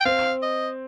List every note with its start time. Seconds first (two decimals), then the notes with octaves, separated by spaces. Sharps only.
0.01 G5
0.05 C4 F5
0.42 D#5